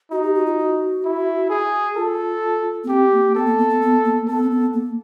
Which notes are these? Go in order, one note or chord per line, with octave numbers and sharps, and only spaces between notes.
D#4 F#4
G4
F#4
F4
F#4
E4
G#4
F4 A4
B3
C4 G4
A#3
B3 A4
A#3
B3
B3
B3
A#3
B3 A4
C4
B3
A#3